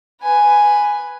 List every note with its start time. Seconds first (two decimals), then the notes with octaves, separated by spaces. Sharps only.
0.21 B4 G#5